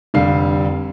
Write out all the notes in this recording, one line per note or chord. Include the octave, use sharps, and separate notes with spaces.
F1 D3 G3 F5 C7